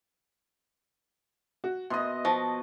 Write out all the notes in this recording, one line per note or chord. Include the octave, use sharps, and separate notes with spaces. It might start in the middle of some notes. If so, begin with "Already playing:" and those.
F#4
B2 D#5 E5 C6 D#6
F3 A5 C#6 A#6